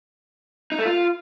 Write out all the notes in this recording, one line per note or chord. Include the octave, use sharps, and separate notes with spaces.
D#4
A3
F4